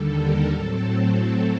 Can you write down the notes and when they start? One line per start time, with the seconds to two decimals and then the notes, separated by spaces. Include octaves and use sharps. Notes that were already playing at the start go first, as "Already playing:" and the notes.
Already playing: D#2 D3 G3 A4
0.11 A#4
0.50 A2 F#3 C4 A4